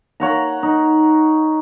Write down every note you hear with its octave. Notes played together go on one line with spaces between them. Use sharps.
C#5 F#5 A#5
D#4